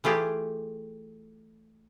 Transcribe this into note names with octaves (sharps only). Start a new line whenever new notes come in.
E3 A3 F4 G4 G#4